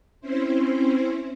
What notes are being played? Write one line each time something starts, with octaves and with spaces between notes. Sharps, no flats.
C4 C#4 E4 C5